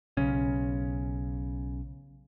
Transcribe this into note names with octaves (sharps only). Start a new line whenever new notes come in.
B1 C#3 C#4